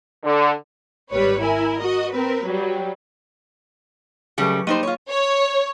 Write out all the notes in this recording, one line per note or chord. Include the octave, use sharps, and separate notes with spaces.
D3
G#1 G3 B4 C#5
E4 A#4 G#5
F#4 D#5
C4 A#4 B4
F#3 G3
C#3 F#3 G3 A3 G#4 C#7
G3 A#3 D#4 C5 D#7
F4 C#5
C#5